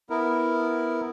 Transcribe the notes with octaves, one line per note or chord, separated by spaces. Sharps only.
B3 E4 A#4